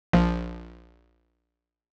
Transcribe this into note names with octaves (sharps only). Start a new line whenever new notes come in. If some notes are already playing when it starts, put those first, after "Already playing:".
A#1 F3